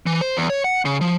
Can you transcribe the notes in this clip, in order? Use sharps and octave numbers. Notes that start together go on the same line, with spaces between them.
E3
C5
E2
C#5
F#5
C#3
F3